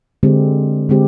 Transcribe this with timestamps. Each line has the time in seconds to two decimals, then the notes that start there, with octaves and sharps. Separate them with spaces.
0.23 D3 G#3 C4 G4
0.89 D3 G#3 C4 G4